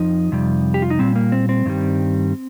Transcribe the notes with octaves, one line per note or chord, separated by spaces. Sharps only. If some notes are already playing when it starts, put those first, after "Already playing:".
Already playing: F2 F3 D#4
F2 C3 G3
G4
F4
D#4
A#2 G3 C4
A#3
C4
C4
G2 D#3 G3